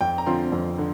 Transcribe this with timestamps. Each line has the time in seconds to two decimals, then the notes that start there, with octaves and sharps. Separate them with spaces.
0.01 F2 G5
0.18 A#5
0.26 D3 F3 C4 F4 C6
0.52 F2
0.78 D3